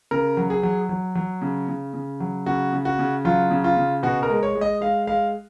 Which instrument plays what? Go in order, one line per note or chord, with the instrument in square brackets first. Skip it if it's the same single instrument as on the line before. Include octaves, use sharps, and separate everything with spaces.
[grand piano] C#3 A#4
F#3
G#4
F#3
F#3
F#3
C#3
C#3
C#3
F#3
C#3 F#4
C#3
F#4
C#3
F#3 F4
C#3
F4
C#3
B2 F#4
A#4
G#3
C#5
G#3
D#5
G#3 F5
G#3 F5